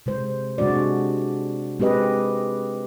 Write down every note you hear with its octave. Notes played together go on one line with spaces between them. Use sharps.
C3 G#3 C5
C3 G#3 D4 F#4 D5
G#3 C4 G4 B4 D#5